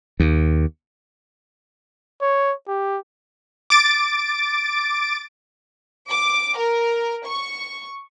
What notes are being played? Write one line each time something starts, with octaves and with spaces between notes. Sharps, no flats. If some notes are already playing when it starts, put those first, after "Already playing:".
D#2
C#5
G4
D6 A6 D7
D6
A#4
C#6